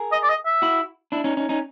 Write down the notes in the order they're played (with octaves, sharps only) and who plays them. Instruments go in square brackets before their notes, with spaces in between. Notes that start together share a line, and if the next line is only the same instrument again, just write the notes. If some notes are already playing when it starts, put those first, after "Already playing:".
Already playing: [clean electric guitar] G#4 A#4
[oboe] D#5
D5
D#5
E5
[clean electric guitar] E4 F#4
D4 E4
C#4 D#4
C#4 D#4
C#4 D#4